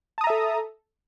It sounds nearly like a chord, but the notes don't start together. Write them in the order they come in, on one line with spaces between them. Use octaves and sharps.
A5 D#6 A#5 E5 A4